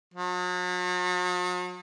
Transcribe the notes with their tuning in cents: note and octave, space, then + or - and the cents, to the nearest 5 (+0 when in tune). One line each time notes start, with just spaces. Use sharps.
F#3 -45